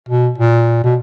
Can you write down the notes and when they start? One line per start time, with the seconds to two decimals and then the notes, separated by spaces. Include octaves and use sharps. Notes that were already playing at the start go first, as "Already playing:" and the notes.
0.09 B2
0.38 A#2
0.84 B2